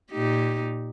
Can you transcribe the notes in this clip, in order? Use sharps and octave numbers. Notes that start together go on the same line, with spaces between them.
A#2 D#4 G4